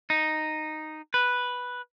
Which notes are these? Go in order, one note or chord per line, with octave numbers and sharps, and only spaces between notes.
D#4
B4